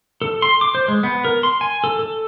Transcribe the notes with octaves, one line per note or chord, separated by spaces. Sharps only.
A4
C6
D6
C5
G#3
B3
A#4
C6
G#5
A4
A4